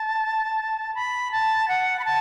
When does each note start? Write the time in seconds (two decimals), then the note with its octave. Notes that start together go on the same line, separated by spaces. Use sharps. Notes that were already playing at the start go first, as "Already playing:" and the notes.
Already playing: A5
0.95 B5
1.32 A5
1.68 F#5
1.99 B5
2.05 A5